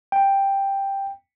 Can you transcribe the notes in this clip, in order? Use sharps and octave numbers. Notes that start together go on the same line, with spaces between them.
G5